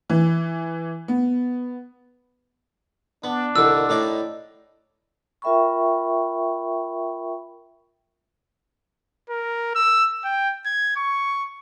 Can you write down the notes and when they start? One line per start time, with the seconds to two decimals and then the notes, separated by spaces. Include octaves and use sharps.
0.10 E3
1.08 B3
3.24 B3 D4
3.56 C2 D3 D#3 E6
3.89 A2 D#4 D5
5.42 F4 A#4 E5 G5 B5 C#6
9.30 A#4
9.76 E6
10.25 G5
10.66 G#6
10.97 C#6